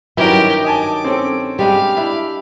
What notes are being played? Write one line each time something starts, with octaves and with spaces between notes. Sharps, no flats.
G2 D#3 F#3 C#4 E4 G4 A#4 B4
D#5 G#5 A5 D6
C4 C#4 A4
G3 G#3 D4 G4 F5
D4 E4